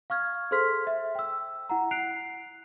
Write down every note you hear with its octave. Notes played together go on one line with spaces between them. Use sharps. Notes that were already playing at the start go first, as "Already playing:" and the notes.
F5 C#6 F6 G#6
G#4 A4 C5 C6 F6 B6
E5
G5 E6
E4 F#5 A#5
F#6 C7 D7 F7